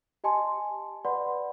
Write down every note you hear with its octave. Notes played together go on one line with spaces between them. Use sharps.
G4 D#5 G#5 A5 C6
B4 D5 F#5 B5 C6